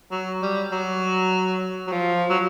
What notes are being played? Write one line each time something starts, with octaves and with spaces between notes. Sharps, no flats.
F#3
G3
F#3
F#3
F3
F#3